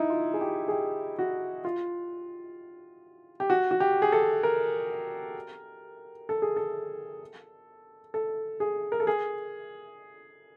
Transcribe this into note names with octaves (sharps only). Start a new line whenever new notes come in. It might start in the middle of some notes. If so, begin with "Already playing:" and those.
Already playing: D#4 E4
F4
G#4
G4
G#4
G4
F#4
F4
G4
F#4
F#4
G4
G#4
A4
A#4
A4
G#4
A4
A4
G#4
A#4
A4
G#4